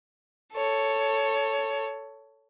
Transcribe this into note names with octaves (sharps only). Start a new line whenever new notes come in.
A4 C#5